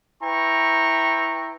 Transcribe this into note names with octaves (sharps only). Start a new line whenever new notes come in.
E4 B4 G5 A#5 C#6